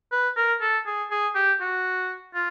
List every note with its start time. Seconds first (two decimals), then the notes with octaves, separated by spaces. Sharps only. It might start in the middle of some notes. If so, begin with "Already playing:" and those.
0.12 B4
0.36 A#4
0.61 A4
0.86 G#4
1.11 G#4
1.35 G4
1.61 F#4
2.35 F4